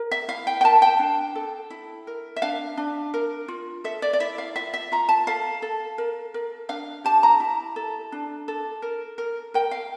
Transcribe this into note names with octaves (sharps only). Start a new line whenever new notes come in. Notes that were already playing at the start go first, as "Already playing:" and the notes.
Already playing: A#4
E5
E4 F5
G5
G5
A#4 A5
G5
D4
A4
E4
A#4
E5
D4 F5
D4
A#4
F4
A4 E5
D5
D5
E4 E5
F5
F4 E5
E5
F4 A#5
A5
A4 F5
A4
A#4
A#4
D4 F5
G4 A5
A#5
E4
A4
D4
A4
A#4
A#4
A#4 G5
F5